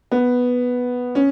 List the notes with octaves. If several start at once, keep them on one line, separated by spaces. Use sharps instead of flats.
B3
C#4